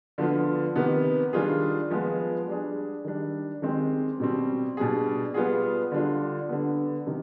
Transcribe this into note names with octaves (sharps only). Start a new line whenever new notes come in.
D3 F3 B3 F4
C3 D#3 B3
D#3 G3 D4 F4 G#4
F3 G#3 B3
G3 D4 G#4
D#3 G3 D4
D#3 G#3 C4 G4
B2 G3 C4
B2 G3 D4 G#4
G3 B3 F4 G#4
D3 G3 D4 F4
D3 G3 B3
C3 D#3